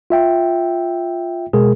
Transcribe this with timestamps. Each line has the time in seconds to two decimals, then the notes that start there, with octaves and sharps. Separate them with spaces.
0.10 F4 E5 G5
1.53 B2 G#3 G#4 A#4